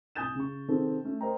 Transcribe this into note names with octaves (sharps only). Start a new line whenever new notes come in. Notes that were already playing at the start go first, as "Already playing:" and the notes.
C2 G#5 D#6 G6 A6 E7
C#3 C#6
C3 D#3 C4 G#4 A4
A3 C#4
A#4 C5 D#5 G5 A#5